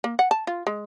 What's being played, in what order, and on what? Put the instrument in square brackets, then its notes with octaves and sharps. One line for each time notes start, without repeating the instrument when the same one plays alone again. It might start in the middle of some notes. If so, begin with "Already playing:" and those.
[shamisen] A#3
F#5
A5
F4
G#3